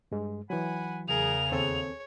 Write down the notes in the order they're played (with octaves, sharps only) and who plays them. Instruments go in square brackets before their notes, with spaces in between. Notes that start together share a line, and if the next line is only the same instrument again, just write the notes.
[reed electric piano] G2 G#3
[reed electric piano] E3 F#3 [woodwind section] F#5 G#5 B5
[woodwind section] E2 C#3 [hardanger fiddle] G#4 A#4 [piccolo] F7
[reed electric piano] D#2 C4 A4 [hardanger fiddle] C#5